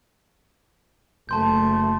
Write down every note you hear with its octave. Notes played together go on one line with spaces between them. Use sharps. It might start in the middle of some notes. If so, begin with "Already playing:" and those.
F#1 A3 A5 C6 G6